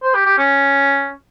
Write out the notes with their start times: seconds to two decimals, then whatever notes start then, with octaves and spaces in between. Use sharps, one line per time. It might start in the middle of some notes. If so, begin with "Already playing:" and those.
0.03 C5
0.15 G4
0.26 G4
0.38 C#4